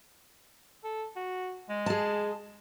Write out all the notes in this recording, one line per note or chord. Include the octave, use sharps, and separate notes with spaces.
A4
F#4
G#3
G#4 A5